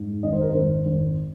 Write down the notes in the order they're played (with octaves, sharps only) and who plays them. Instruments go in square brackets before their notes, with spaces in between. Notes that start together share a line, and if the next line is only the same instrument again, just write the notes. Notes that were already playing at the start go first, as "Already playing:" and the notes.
Already playing: [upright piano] G#2
G#1 D#5
C5
A#4
G#1 C5
G#1